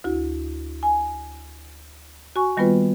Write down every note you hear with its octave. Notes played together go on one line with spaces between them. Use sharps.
D2 E4 F#4
G#5
F#4 G#5 C#6
D#3 G3 A#3 B3 F4 B4